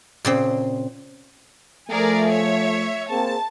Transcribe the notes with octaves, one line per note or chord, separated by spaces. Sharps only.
A#2 C#3 C4
F3 A3 G#4 A#4 D5
C#5 E5
A#3 C4 G#4 A5